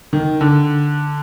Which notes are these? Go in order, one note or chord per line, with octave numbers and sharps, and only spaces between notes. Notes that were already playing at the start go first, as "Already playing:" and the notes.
D#3
D3